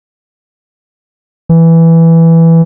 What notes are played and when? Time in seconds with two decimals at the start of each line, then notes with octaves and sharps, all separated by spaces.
1.49 E3